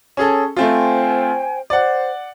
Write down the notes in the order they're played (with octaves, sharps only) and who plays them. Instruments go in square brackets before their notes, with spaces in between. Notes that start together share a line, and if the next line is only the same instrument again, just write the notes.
[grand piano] C#4 G#4 A4
[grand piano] A3 C4 F4 [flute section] C5 G5 G#5
[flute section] C5 [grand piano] D5 F#5